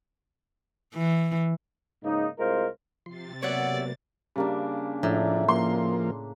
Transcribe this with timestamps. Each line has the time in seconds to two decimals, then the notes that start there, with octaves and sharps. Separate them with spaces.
0.94 E3
2.04 G#2 C#3 A#3 D#4
2.39 C2 G#3 F4 A#4 C5
3.06 C3 F3 C6 A6
3.42 F#3 A#3 B3 C#5 D5 E5 F#5
4.36 C#3 G3 A#3 D4
5.03 A2 F3 D4 E5 A#5
5.49 F3 A#3 C6